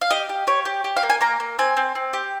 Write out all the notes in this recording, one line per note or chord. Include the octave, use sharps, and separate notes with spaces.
F5
G4 D#5
G4
G4 C#5
G4
G4
F5
A#3
G#5
A#3 A#5
A#3
C4 G#5
C4
C4
G4